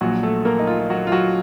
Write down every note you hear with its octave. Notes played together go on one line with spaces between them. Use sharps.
A#1 A#2 F3 F#3 F#4
A3 A4
A#3 A#4
D#4
F4
F4
F#3 F#4
F4
F#3 F#4